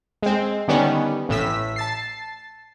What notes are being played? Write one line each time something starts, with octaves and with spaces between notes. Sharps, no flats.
G#3 C4
D3 D#3 G3 B3 C#4
A1 A2 E6 B6
A5 A6 C7